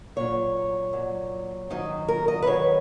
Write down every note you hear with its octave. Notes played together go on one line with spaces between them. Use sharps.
A#2 F#3 C#5
A#2 F#3
G#2 D#3 F#3 D#4
A#4
D#5
B4
G#2 D#3 F#3 C#5